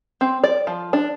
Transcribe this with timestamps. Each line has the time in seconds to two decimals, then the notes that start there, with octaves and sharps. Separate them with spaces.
0.21 C4
0.44 D5
0.67 F3
0.93 D4